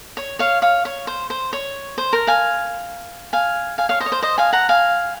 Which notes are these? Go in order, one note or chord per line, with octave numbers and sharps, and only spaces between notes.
C#5
C#5 F5
C#5 F5
C#5
C5
C5
C#5
C5
A#4
F5 G#5
F5 G#5
F5 G#5
C#5 F5
C5 D#5
C#5
C5
C5 D#5
F5 G#5
F#5 A#5
F5 G#5